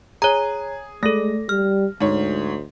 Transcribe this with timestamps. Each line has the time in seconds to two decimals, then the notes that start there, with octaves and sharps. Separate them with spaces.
0.22 G#4 C#5 A#5
1.03 G#3 A3 A4 A#6
1.49 G3 F6
2.01 D2 G#2 C#5